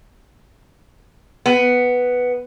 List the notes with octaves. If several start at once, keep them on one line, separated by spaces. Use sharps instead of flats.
B3